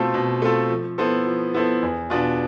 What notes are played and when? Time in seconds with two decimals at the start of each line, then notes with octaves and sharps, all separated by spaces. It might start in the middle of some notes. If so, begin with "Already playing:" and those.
Already playing: B2 A3 C4 F4 A4
0.14 B2
0.42 A3 C4 F4 A4
0.69 F3
0.98 B3 E4 A4 C5
1.27 F3
1.54 B3 E4 A4 C5
1.83 E2
2.10 B2 B3 D4 F4